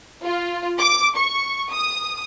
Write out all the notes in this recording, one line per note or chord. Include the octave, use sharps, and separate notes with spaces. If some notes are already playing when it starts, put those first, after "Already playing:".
F4
D6
C#6
D#6